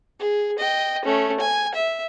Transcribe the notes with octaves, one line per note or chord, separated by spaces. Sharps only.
G#4
D#5 G5
A3 C#4
G#5
E5